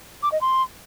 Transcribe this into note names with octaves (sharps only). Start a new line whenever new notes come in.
D6
D#5
C6